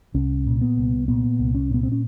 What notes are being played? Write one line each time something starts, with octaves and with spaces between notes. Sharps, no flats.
C2 C#4
A#2
B3
C2
A#2 B3
C2
C#4
A#2 B3
C4
C#4